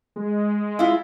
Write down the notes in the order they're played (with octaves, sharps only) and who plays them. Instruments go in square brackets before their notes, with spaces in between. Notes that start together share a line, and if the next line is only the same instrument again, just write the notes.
[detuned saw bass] G#3
[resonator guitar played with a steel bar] E4 F4